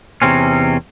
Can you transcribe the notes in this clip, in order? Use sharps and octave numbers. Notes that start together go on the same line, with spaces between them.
E2 C3 C4 C#4